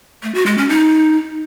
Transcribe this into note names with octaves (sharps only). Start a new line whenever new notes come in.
A3
F#4
G#3
C#4
D#4